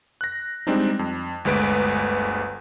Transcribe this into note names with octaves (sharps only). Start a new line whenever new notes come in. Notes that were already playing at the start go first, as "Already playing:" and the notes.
F#6 A#6
G3 G#3 C4 D4 D#4
F2
G1 D2 G#3 B4 D7